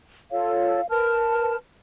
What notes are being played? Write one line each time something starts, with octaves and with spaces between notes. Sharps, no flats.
F4 A4 C#5 F5
A#4 B4 A5 F6